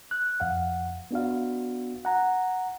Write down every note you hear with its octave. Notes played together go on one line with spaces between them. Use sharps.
F#6
F2 F5 F#5
B3 D4 F#4 F5
F#5 A#5